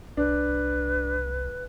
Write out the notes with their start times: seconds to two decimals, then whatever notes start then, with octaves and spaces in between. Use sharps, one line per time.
0.17 C2 D4 B4